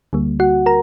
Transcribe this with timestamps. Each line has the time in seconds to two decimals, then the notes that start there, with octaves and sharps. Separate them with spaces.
0.13 D2 D3 G3 A#3
0.40 F#4 F#5
0.66 A#4 A#5